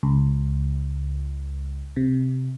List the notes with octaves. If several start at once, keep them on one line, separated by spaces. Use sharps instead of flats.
C#2
C3